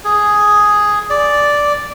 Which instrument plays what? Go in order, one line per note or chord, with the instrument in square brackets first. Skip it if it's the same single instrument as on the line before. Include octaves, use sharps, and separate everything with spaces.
[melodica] G#4
D5